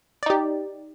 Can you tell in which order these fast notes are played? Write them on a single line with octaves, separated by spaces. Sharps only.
D5 D#4 G4